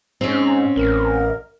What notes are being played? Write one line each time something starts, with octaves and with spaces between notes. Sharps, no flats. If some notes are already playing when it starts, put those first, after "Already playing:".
G#2 C4 C#4
A1 A#4